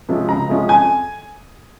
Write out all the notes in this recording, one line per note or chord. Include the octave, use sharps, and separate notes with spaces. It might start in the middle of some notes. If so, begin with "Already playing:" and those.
C3 F3 G#3 C#4
C#2 A#5
C3 F3 G#3 C#4
F2 G#5